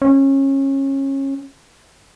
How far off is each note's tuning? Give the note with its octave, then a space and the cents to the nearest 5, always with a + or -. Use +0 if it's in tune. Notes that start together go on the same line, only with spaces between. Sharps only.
C#4 -25